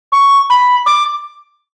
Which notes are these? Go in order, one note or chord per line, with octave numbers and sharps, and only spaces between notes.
C#6
B5
D6